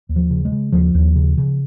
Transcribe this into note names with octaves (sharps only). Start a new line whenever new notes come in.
D#2
F3
C#3
G#3
C#3
D#2 F3
D#2
C#3
C#3